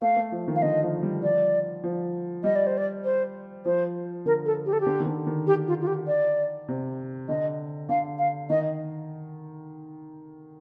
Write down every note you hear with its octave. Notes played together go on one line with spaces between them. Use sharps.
A3 F5
A3
F3
D#3
F5
D3 D#5
F3
G3
F3 D5
F3
G3 D#5
D5
C5
D5
C5
F3 C5
D3 A#4
A4
G4
A4
G4
D3
D#3
D3
D#3
G4
F4
F4
G4
D5
C3
D3 D#5
D3 F5
F5
D#3 D#5